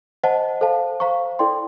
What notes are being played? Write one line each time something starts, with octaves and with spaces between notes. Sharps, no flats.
C5 D#5 F#5 A5
A4 C5 F5 A5
C5 F5 A#5 C#6
E4 A4 D5 G5 C6